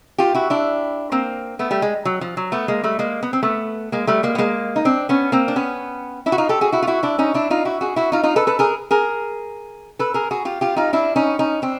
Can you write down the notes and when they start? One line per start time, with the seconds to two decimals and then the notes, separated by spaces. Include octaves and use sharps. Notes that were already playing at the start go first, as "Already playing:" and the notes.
0.18 F4 G4
0.34 E4 F#4
0.50 D4 E4
1.12 A#3 C4
1.59 A3 B3
1.71 G3 A3
1.82 G#3
2.05 F#3
2.21 F3
2.37 F#3
2.52 A3 B3
2.68 G#3 A#3
2.84 G3 A3
2.99 G#3 A#3
3.23 B3
3.33 C4
3.43 A3 B3
3.92 G#3 A#3
4.07 G3 A3
4.23 G#3 A#3
4.35 B3
4.38 G#3 A#3
4.76 D#4
4.85 C4 D4
5.09 B3 C#4
5.32 A#3 C4
5.48 D4
5.56 B3 C#4
6.26 D4 E4
6.32 F#4
6.38 D#4 F4
6.49 G4 A4
6.61 F#4 G#4
6.72 E4 F#4
6.82 F4
6.87 E4 F#4
7.03 D4 E4
7.18 C#4 D#4
7.34 D4 E4
7.50 D#4 F4
7.65 E4 F#4
7.81 F#4 G#4
7.96 E4 F#4
8.12 D#4 F4
8.23 D#4 F4
8.36 A4 B4
8.47 A4 B4
8.59 G#4 A#4
8.91 G#4 A#4
9.99 A4 B4
10.14 G#4 A#4
10.31 F#4 G#4
10.45 F4 G4
10.61 F4 G4
10.76 D#4 F4
10.93 D4 E4
11.16 C#4 D#4
11.39 C#4 D#4
11.62 C4 D4